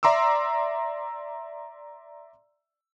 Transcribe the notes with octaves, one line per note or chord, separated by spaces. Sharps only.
D5 E5 A#5 C6 D6 E6